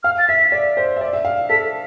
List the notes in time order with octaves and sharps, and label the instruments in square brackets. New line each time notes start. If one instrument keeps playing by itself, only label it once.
[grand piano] F5 [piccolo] F6
[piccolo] A6
[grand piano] E5 [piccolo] B6
[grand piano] D5
C5
E5
D5
E5
F5
[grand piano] A4 [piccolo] B6